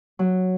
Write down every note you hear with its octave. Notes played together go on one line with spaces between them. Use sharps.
F#3